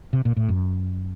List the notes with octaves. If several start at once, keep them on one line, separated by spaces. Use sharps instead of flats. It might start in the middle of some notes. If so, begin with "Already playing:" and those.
C3
A#2
A2
F#2